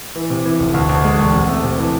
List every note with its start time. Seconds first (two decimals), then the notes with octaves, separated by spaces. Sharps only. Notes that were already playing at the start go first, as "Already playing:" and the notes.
0.16 E3
0.30 C3
0.45 E3
0.60 F1
0.74 D2
0.89 D2
1.04 G#3
1.18 E1
1.34 C3
1.48 A3
1.63 C3
1.78 E3